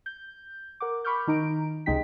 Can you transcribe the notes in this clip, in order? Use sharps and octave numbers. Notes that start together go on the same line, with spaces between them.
G6
A#4 F#5 D6
B5 C#6 D6 F6 G6
D#3 D#4 A#5 D7
C#2 C3 G#3 D#4 G5 B6